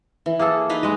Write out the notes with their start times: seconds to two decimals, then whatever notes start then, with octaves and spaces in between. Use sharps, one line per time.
0.26 E3
0.39 A#3 G#4 A4
0.70 D#4 B4 F5
0.83 G#3 D#5